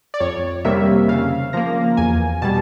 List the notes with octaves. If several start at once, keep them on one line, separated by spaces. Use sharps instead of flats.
D5
F2 C#5
C3 D#3 G3 A#3 E5
C#3 F5
F3 A#3 A#5
E2 G#5
B2 G3 A5